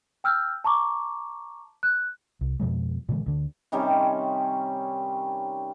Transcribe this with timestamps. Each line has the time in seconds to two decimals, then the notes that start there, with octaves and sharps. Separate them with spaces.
0.24 G5 E6 F6 G6
0.64 A5 A#5 C#6 D6
1.83 F#6
2.41 C2
2.60 F2 B2 F3 G#3
3.09 A#2 D3 E3 G#3
3.26 D2 D3
3.72 C3 D#3 G3 C#4